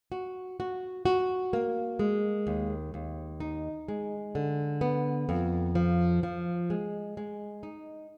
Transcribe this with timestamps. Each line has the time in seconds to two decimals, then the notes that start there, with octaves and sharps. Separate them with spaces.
0.12 F#4
0.60 F#4
1.05 F#4
1.53 A#3
1.99 G#3
2.47 D#2
2.94 D#2
3.40 D#4
3.88 G#3
4.35 D3
4.81 B3
5.29 F2
5.75 F3
6.23 F3
6.70 G#3
7.17 G#3
7.63 D#4